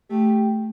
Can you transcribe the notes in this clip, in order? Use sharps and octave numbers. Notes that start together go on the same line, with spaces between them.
A3 G4